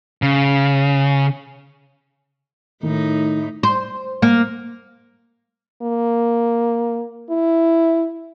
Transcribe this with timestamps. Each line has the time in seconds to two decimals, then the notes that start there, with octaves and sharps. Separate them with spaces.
0.22 C#3
2.83 A2 D#3 D#4
3.63 C5
4.22 A#3
5.82 A#3
7.30 E4